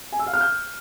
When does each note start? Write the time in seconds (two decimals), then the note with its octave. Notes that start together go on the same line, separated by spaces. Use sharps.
0.12 G#5
0.19 E6
0.26 F5
0.34 F6
0.41 G6